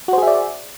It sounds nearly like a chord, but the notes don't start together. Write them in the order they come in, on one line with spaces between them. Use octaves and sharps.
F#4 C5 G#4 E5 D5